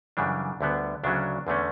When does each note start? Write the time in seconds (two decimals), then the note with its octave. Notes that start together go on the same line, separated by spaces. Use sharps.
0.17 F#2 C#3 E3 G3 D4
0.61 D2 D3 G3 B3
1.03 D2 C#3 F#3 C#4 D4
1.47 E2 D3 A3 C#4